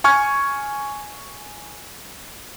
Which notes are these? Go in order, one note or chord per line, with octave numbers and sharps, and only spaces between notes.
G#5 C#6 F6 G#6